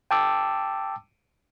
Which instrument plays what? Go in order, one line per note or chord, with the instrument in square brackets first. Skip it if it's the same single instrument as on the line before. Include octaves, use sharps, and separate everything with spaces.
[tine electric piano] G5 A5 D6 E6